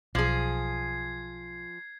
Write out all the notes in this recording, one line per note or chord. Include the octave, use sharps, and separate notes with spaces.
B1 F3 G#4 G#6 C7